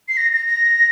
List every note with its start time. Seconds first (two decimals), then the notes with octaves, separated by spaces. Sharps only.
0.09 C7
0.17 A#6
0.32 A#6
0.47 A#6